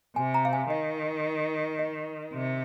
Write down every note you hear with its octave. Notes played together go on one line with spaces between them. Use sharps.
C3 G#5
A#5
F5
G#5
D#3 D#5
D#5
C3